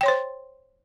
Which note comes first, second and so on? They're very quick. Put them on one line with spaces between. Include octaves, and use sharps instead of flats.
G5 C#5 C6 C5